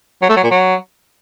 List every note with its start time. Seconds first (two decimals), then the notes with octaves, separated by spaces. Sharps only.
0.22 F#3
0.29 A3
0.36 F#3
0.44 A#2
0.51 F#3